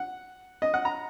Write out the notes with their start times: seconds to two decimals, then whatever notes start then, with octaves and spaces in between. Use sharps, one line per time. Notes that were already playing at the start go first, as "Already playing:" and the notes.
Already playing: F#5
0.62 D#5
0.74 F#5
0.85 A#5